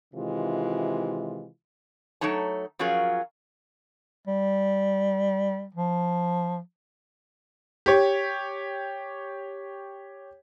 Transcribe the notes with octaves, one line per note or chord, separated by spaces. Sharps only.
C3 D#3 E3 G#3 F4
F#3 A3 D#4 C#5 A5
F3 F#3 C#4 F4 G#4 A#4
G3
F3
G4 C#5